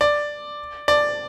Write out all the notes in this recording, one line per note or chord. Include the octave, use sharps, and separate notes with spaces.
D5
D5